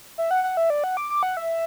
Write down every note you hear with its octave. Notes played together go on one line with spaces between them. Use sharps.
E5
F#5
F#5
E5
D5
F#5
D6
D6
F#5
E5